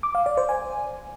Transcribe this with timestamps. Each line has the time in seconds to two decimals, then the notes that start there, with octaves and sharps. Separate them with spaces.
0.03 D6
0.15 F5
0.26 D5
0.37 C5
0.49 G#5